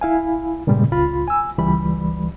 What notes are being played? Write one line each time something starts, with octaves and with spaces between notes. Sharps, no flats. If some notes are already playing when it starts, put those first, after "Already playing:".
E4 F5 G#5
G2 A#2 C#3 G3 G#3
C#2 F4 B5
G#5 E6
C#2 E3 G3 B5